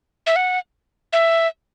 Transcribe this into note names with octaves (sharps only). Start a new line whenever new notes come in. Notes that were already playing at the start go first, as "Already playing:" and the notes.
E5
F#5
E5